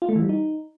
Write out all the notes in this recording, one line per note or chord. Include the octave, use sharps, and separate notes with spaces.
F4
A3
E3
G3
D#4